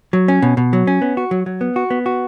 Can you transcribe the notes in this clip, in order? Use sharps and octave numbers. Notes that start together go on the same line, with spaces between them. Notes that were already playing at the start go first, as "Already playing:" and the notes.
F#3
C#4
B2
B2
F#3
C#4
B3
F#4
F#3
F#3
B3
F#4
B3
F#4